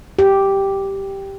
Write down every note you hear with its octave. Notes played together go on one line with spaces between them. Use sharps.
G4